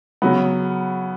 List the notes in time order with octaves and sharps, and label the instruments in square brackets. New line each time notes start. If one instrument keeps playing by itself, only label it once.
[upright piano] C#3 F#3 B3